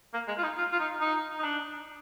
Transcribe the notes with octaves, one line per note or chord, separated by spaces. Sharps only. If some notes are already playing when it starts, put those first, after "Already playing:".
A#3
G#3
F4
D#4
F4
F4
D#4
D#4
D#4
D4